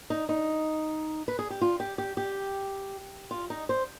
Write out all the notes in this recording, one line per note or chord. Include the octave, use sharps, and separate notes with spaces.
D#4
D#4
B4
G#4
G4
F4
G4
G4
G4
F4
D#4
C5